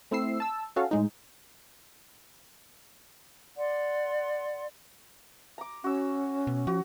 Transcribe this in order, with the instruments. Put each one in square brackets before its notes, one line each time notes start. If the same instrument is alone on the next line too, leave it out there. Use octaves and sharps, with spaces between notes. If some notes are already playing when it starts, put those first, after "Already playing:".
[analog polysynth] A3 C4 E4 E6 C7
A5 E6
C#4 F#4 A4 F5
A2 G#3 D#4
[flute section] D5 F#5 C6
[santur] A#5 D6
[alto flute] C#4 [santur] F#4 E6
[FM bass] B2
[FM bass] F3 [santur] F#4